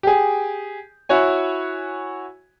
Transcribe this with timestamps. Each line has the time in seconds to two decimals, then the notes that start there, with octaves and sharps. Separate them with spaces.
0.03 G4 G#4
1.09 E4 F#4 C#5 G#5